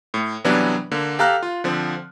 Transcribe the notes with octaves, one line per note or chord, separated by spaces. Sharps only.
A2
C3 E3 F#3 G3 B3 D4
D3 A#3
G4 A4 F5 A#5 F6 F#6
F4
D3 F3 C4